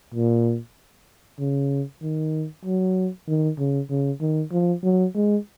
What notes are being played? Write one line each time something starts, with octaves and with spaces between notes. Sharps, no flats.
A#2
C#3
D#3
F#3
D#3
C#3
C#3
D#3
F3
F#3
G#3